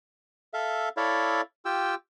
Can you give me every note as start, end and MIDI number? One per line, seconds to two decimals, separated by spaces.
0.54 0.89 69
0.54 0.89 76
0.54 0.89 77
0.97 1.41 64
0.97 1.41 69
0.97 1.41 73
0.97 1.41 74
0.97 1.41 76
0.97 1.41 77
1.65 1.95 65
1.65 1.95 67
1.65 1.95 79
1.65 1.95 88